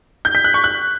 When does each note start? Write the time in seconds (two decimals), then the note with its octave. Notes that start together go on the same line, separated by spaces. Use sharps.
0.25 G6
0.35 B6
0.44 F#6
0.54 C#6
0.64 F#6